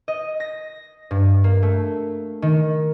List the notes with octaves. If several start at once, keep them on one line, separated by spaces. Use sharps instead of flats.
D#5
A#6
G2
A#3
A3
D#3